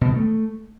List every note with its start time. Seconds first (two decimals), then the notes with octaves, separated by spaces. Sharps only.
0.01 B2
0.09 D#3
0.16 A3